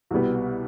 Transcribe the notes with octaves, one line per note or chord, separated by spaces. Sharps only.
C2 B2 G3 B3